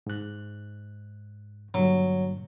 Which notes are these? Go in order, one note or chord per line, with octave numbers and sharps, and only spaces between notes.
G#2 F#6
G2 A#2 D3 F#3